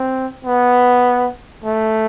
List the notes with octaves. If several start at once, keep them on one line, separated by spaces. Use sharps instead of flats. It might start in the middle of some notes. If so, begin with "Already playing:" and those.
Already playing: C4
B3
A3